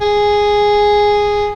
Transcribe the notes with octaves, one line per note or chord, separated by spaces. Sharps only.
G#4